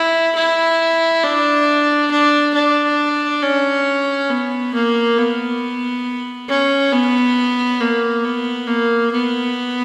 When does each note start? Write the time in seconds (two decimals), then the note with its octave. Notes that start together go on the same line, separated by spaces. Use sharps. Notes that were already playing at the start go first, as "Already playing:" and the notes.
Already playing: E4
0.35 E4
1.23 D4
2.11 D4
2.54 D4
3.42 C#4
4.30 B3
4.74 A#3
5.18 B3
6.49 C#4
6.93 B3
7.81 A#3
8.25 B3
8.68 A#3
9.12 B3